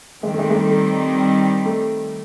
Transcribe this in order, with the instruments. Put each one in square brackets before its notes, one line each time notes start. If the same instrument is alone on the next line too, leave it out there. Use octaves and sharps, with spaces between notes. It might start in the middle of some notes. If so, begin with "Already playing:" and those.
[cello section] D#3 G3 C4 [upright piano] G#3
[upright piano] A3
G#3
G#3
A3
A3
A3